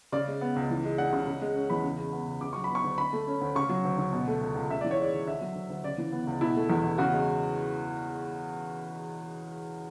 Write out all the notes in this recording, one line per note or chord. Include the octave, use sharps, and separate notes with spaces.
C#3 D5
G#3
B3
C#2
E3
G#3
D4 F#5
C#3
C#3
G#3
C#4
E2 B5
C#3
G#3
B3
C#2
C#3 D6
F#3 C#6
B5
B3
C#6
D2
D3 B5
A3
C#4
D2
C#3 C#6
F#3
D2
D2
B2
A3
C#2
C#2
C#3 E5
E3 D5
C#5
G#3 D5
D2
D3 E5
F#3
D2
D2
C#3 D5
E3
B3
C#2
B2 E4
A3
E2
E2
C#3 F#4
G#3